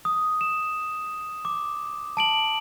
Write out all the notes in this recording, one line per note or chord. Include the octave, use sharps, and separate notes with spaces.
D#6
E7
D6
A5 D7 F#7